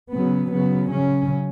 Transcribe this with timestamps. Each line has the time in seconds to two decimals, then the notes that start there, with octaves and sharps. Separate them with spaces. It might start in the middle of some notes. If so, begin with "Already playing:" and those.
0.11 C#3 F#3 B3
0.52 C#3 F#3 B3
0.91 C#3 F#3 C#4